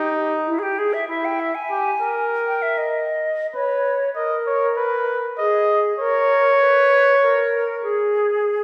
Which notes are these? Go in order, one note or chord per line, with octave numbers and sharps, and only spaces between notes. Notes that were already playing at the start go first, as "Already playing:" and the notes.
Already playing: D#4 G4
E4
G#4
G4
G#4
E5
E4 E5
G5
E5
G#5
G4
A#4
G5
E5
D#5
B4 C#5
A#4 D#5
C#5
B4
G#4 D#5
A#4 C#5
B4
A#4
G#4